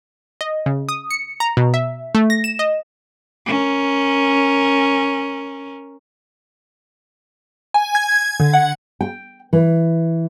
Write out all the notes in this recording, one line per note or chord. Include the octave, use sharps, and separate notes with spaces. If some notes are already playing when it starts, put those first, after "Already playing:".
D#5
C#3
D#6
C#7
A#5
B2
E5
A3
A#6
E7
D#5
C#4 A#4
G#5
G#6
D3
F#5
G5
E3